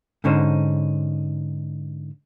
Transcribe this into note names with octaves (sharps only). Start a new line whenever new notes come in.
G#2 D3 C#4 D#4 C5